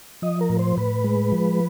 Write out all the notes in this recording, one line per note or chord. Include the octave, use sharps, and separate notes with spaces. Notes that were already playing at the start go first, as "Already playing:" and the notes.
F3 D#5
A#4
A2
C5
A2 B4
G#3
F3